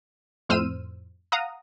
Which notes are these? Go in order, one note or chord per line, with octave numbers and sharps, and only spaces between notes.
F2 A2 C5 E6 F6 D#7
F5 F#5 A#5 D#6